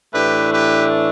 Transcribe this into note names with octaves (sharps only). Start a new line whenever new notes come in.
A2 E3 A3 D4 G4 B4
G4 B4